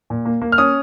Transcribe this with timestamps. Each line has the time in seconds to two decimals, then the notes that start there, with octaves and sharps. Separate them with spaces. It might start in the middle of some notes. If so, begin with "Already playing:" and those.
0.10 A#2
0.25 A#3
0.42 A#3
0.52 F6
0.58 C#4 D#6